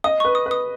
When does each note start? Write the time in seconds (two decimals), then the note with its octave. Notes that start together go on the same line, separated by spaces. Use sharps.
0.04 D#5 D#6
0.20 B4 C#6
0.35 D#6
0.46 B4
0.51 D#6